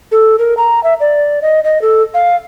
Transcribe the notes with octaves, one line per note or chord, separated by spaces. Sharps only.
A4
A#4
A#5
E5
D5
D#5
D#5
A4
F5